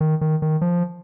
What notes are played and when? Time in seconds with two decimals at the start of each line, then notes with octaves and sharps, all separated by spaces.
0.01 D#3
0.21 D#3
0.42 D#3
0.61 F3